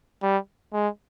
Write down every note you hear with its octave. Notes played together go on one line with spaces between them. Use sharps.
G3
G#3